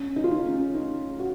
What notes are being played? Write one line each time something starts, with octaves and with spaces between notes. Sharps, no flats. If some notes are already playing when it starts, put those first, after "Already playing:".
Already playing: C#4
D#4
F4
D#4
C#4
D#4
F#4